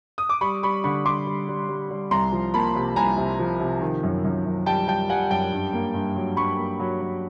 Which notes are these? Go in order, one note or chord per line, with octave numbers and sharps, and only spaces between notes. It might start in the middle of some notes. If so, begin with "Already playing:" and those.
D#6
D6
G3 B5 C#6
G3 B5 C#6
D3 B5 C#6
G3 C6 D6
G3
G3
G3
G3
C2 A#5 C6
F3
A#3 A5 B5
C3
C2 G#5 A#5
C3
F3
C3
D#3
F#2
F#2
F#2
G3 G5 A5
G3 G5 A5
G3 F#5 G#5
F#2 G5 A5
G2
A#3
G2
F#3
G2 B5 C#6
A#3
F#3
F#3